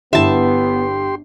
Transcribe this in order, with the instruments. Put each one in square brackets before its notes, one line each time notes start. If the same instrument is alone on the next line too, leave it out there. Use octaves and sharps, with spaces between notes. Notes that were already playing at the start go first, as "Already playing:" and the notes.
[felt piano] G1 E4 [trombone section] B3 [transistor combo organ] G4 C6 [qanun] E5 A5